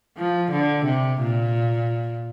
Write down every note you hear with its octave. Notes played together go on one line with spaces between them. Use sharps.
F3
D3
C3
A#2